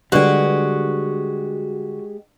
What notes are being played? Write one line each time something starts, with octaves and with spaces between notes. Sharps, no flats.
D3 G3 G#3 D4 F#4 G4 B4 D5